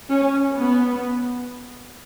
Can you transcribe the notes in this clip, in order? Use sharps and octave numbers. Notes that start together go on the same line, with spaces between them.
C#4
B3